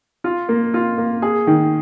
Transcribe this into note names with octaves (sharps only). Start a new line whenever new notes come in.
F4
A#3
F4
A#3
G#4
D#3